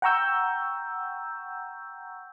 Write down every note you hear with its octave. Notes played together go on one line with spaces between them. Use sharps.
F#5 G5 A#5 C#6 E6 G6